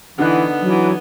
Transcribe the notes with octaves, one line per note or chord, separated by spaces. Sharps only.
D3 E3 B3 D#4 F#6
E3 F#3